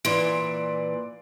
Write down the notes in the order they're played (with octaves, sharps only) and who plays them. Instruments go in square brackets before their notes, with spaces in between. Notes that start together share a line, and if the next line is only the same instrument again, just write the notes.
[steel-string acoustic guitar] A#2 E3 [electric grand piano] D5 C6 D7